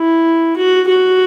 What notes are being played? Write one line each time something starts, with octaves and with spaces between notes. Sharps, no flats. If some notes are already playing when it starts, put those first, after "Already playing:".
Already playing: E4
F#4
F#4